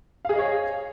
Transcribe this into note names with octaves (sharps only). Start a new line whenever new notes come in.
G#4 C#5 D#5 F5